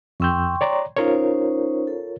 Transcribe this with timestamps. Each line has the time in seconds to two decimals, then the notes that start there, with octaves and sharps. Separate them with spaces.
0.20 F2 G5 C6 C#6 E6 G6
0.61 C#5 D5 A#5
0.96 C#4 D#4 F4 A#4 C5 C#5
1.87 A4